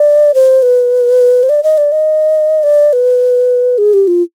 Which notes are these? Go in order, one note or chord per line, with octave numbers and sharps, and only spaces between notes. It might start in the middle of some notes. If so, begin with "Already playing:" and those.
Already playing: D5
C5
B4
C5
D5
D#5
D5
D#5
D5
B4
G#4
G4
F4